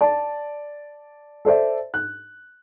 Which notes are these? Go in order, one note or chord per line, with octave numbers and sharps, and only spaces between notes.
D5 A5
A4 C5 D5 E5
F#6